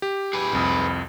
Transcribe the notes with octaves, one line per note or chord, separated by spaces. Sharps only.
G4
G#4 B4
C2 F2 D#6